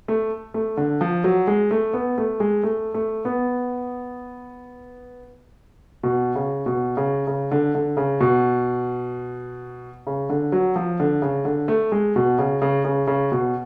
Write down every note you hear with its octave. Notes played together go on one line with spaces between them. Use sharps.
A3
A3
D3
F3
F#3
G#3
A3
B3
A3
G#3
A3
A3
B3
B2
C#3
B2
C#3
C#3
D3
D3
C#3
B2
C#3
D3
F#3
F3
D3
C#3
D3
A3
G#3
B2
C#3
C#3
C#3
C#3
B2